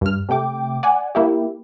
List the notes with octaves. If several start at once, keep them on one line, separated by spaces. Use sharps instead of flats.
G2 F6
C3 A3 G5 D6
D5 F#5 G#5
A#3 E4 G4